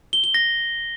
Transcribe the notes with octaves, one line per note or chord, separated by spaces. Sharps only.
G7
G7
A#6